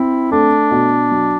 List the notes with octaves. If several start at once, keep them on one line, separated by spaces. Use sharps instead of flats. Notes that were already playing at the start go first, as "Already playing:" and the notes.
Already playing: C4 E4
A3 D4
B2
F#3